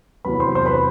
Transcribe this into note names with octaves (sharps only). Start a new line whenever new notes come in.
E2 C3 F#3 B4 B5
C5 C6
C5 C6
B4 B5